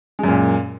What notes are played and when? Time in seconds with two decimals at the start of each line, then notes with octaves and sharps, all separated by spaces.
0.19 G#3
0.24 F#2
0.28 A#2